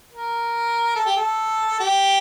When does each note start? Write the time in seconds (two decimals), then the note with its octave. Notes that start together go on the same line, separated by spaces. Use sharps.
0.12 A#4
0.96 A4
1.06 G4
1.16 A4
1.80 G4